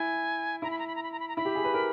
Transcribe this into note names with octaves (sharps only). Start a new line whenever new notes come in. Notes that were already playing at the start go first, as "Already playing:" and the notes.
Already playing: E4 G#5
E4 A#5
B5
A#5
B5
A#5
B5
A#5
B5
A#5
E4 B5
G4
G#4
B4
A#4